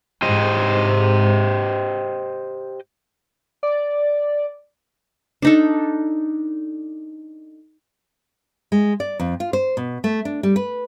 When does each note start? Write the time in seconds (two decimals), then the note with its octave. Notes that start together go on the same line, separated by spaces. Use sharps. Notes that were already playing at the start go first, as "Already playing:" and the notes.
0.22 G#2 G4 C5 D#5
3.63 D5
5.42 D4 D#4 A4
8.72 G#3
9.00 D5
9.19 F2
9.40 F4
9.53 C5
9.77 B2
10.04 A3
10.25 D4
10.43 G3
10.56 B4